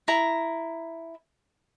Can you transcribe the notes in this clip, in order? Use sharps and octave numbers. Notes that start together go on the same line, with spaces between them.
E4 A#5